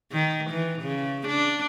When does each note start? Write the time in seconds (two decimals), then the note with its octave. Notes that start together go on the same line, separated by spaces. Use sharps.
0.13 D#3
0.50 E3
0.82 C#3
1.27 D4